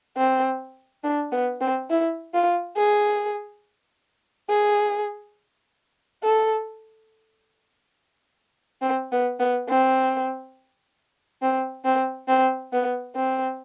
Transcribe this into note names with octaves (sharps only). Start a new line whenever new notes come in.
C4
D4
B3
C4
E4
F4
G#4
G#4
A4
C4
B3
B3
C4
C4
C4
C4
B3
C4